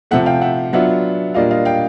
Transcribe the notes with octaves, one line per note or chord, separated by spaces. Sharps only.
C3 F3 A3 E5 F#5
F5 G5
E5 F#5
F#3 B3 D4 F4 E5 F#5
A#2 G3 A#3 D4 F4 D#5 F5
D#5 F5
F5 G5